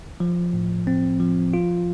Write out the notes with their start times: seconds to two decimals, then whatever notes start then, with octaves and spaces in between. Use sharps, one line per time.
0.20 F3
0.53 A2
0.87 C4
1.20 F3
1.54 F4